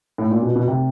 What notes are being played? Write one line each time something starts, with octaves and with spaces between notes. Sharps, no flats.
A2
A#2
B2
B2
C3